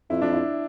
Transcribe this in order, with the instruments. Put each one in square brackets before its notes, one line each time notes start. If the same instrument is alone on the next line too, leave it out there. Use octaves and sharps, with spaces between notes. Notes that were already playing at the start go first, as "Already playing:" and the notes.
[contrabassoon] F2 [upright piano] E4
[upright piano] D4
E4